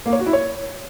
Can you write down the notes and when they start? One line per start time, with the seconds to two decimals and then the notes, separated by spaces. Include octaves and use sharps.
0.06 A#3
0.13 C#5
0.19 F#4
0.26 E4
0.33 C#5